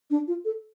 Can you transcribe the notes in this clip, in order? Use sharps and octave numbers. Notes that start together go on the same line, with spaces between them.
D4
F4
A4